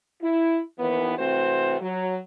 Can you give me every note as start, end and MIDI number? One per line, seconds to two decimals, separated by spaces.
0.21 0.59 64
0.79 1.13 39
0.79 1.13 52
0.79 1.13 59
1.18 1.76 48
1.18 1.76 52
1.18 1.76 57
1.18 1.76 60
1.18 1.76 66
1.18 1.76 72
1.80 2.16 54